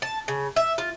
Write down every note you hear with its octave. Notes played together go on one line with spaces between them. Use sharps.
A5
C#3
E5
F4